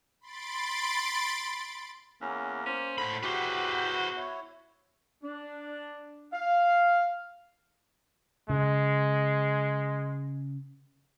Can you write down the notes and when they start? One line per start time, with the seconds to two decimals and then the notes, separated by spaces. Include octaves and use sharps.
0.21 B5 C6 A6 D7
2.22 E2 A#3 C#4
2.66 C#4 C5
2.98 A2 D3 B5
3.23 E2 F#4 G4 B4 C5
4.17 E4 C#5
5.22 D4
6.31 F5
8.50 C#3 G#3